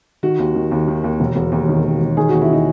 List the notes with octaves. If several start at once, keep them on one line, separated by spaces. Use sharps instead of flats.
D#3 F#4
D#2
D#3
D#2
D#3
D#2
E1
E1
D#2
D#3
E1
E1
D#3 G#4
D#2 F#4
E4
D#3 D#4